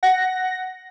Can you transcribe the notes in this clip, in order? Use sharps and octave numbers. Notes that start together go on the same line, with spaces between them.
F#5 A#6